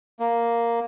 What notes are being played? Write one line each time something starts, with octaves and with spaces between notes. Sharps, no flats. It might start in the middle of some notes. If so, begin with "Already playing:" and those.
A#3